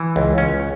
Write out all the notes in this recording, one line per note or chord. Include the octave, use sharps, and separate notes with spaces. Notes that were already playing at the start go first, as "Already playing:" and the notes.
Already playing: E3
C#2
C#2 C#4